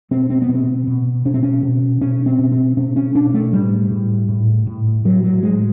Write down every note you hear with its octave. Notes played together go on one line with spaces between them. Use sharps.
B2 C4
C4
B3
B2
C4
B2
B2 C#4
C4
C#4
B2
B2 C#4
C4
B2
C4
B2 C#4
C#4
B2 D4
A3
A2 G3
A2
A2
A2
A2 F#3
F#3
A2 G#3